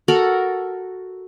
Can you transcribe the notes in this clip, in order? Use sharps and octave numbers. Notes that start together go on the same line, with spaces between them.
F#4 A4 A#4 F#5